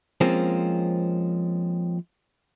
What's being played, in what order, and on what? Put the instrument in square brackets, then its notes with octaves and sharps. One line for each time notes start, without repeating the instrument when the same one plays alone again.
[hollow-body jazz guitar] F3 G#3 A#3 C4 C#4